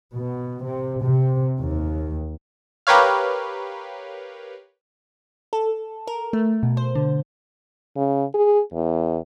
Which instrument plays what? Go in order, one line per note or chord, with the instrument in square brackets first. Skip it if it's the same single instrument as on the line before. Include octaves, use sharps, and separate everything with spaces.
[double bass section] B2
C3
C3
D#2
[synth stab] G4 A#4 B4 C#5 F5
[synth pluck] A4
A#4
A3
B2
C5
D3
[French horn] C#3
G#4
E2